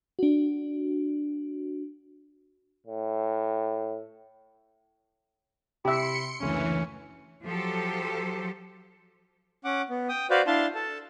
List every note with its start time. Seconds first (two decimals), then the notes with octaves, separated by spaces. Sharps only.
0.19 D4 F#4
2.87 A2
5.85 C3 E4 G4 E5 C6 C#7
6.40 F#1 D2 C#3 E3 C#4
7.44 F3 F#3 G4 A4 C5
9.64 C#4 F#5 D6
9.90 B3
10.09 G5 D#6
10.30 F#4 B4 C5 D5 F5
10.47 D4 E4 F5 A5 C6
10.75 A4 A5